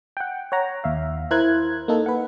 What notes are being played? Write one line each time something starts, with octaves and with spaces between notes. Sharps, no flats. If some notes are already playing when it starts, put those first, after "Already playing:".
F#5 G5
C#5 F#5 A#5
D#2 E5 F5
E4 A#4 C5 F#6 G#6
A#3 D#4 A4
B4 F#5